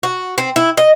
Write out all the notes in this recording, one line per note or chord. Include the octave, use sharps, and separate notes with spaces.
F#4
C4
E4
D#5